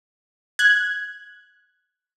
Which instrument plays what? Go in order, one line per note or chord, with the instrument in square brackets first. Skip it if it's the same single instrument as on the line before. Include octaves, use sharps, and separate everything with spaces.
[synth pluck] F#6 G#6